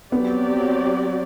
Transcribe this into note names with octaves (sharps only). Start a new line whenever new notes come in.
F#3 B3 C4 G4 D5